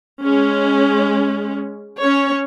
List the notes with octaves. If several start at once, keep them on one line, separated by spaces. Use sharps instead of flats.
G#3 C#4
C#4 C#5